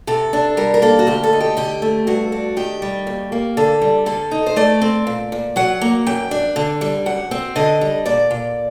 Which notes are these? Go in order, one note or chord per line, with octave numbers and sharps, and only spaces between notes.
C3 A4
D4
G3 A#4
A#4
A#3 A4
F#4
D2 G4
A4
D#4
G4
D3 G4
A3
G2 F#4
D4
D#3 G4
G3
D#2
A#3
D3 A4
G3
D3 A4
D#4
C5
A3 D5
C4
A#2
A#2
F#3 F#5
A#3
F#2 G5
D4
D3
G3
F#2 F#5
C4
D3 D#5
G3
A#2 D5
A#2